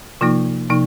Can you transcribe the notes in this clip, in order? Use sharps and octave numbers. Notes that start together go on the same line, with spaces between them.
C3 F3 A#3 D#4 F4
C3 F3 A#3 D#4